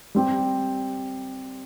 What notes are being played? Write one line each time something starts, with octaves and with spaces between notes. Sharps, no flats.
G3 C4 G4